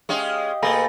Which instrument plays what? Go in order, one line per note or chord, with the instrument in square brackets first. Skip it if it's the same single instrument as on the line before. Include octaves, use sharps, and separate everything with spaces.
[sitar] G#3 C#4 G#4 [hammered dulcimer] G4 D#5 F5
[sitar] B2 A3 G#4 [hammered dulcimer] A#3 [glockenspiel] G#5 B5 A#6